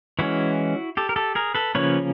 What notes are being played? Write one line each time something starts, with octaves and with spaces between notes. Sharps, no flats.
E3 G#3 C#4 E4 F#4
G4 A4
A#4
G4 A4
G#4 A#4
A4 B4
C#3 F3 A#3 C#4 B4 C#5